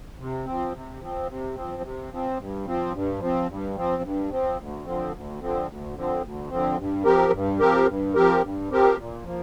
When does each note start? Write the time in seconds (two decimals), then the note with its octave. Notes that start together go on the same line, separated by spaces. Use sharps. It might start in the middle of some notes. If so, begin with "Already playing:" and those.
0.18 C3
0.45 F3 C4
0.73 C3
1.00 F3 C4
1.28 C3
1.55 F3 C4
1.82 C3
2.11 F3 C4
2.38 G2
2.66 F3 C4
2.93 G2
3.20 F3 C4
3.48 G2
3.76 F3 C4
4.03 G2
4.30 F3 C4
4.58 D2
4.85 D3 F3 C4
5.12 D2
5.40 D3 F3 C4
5.67 D2
5.95 D3 F3 C4
6.22 D2
6.49 D3 F3 C4
6.77 G2
7.04 F3 C4 G4 A#4
7.32 G2
7.59 F3 C4 G4 A#4
7.87 G2
8.14 F3 C4 G4 A#4
8.42 G2
8.69 F3 C4 G4 A#4
8.97 A#2
9.24 F3 A#3